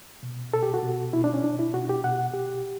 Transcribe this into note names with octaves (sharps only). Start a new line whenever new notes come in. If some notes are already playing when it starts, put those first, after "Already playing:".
B2
B2 A4
G4
F#4
B2
B2 E4
D4
C#4
B2 D4
E4
B2 F#4
G4
B2 F#5
B2 G4